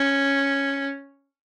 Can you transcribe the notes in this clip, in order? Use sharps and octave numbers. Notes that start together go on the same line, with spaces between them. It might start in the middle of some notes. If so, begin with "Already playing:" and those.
Already playing: C#4